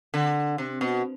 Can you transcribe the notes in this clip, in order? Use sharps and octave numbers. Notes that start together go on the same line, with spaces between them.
D3
C3
B2